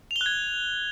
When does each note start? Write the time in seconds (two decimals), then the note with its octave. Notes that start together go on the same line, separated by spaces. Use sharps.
0.11 F7
0.16 G7
0.21 F#6
0.26 G#6